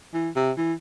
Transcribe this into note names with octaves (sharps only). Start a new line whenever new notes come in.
E3
C3
E3